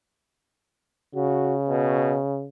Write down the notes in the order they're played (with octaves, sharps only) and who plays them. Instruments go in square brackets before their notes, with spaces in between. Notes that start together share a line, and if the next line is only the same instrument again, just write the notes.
[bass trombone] C#3 [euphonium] F#4
[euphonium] B2